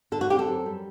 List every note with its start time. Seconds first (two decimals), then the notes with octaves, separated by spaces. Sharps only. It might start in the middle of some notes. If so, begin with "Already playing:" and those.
0.12 D3 A4
0.21 F#4
0.30 C4 G4
0.39 A4
0.48 F#2
0.66 G3